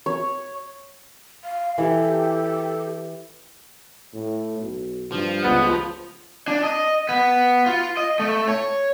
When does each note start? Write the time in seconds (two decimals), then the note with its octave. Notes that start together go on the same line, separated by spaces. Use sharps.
0.06 C#5
1.44 F5
1.78 E3 G4 A4
4.14 A2
4.59 B1
5.12 G2 F3
5.43 C#2 B3 F#5
6.48 D4
6.63 D#5
7.09 B3
7.66 F4
7.97 D#5
8.20 A3
8.47 C#5